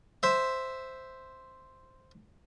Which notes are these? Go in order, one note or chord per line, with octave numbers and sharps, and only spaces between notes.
C5 E5